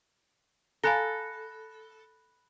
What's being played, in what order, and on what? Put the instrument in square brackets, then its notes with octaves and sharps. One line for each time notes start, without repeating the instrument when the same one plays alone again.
[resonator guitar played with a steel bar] A4 [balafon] F5 G#5 A#5 [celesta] B5 F#6 A#6